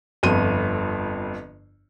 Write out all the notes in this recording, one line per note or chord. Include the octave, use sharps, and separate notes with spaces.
G1 F2 D#7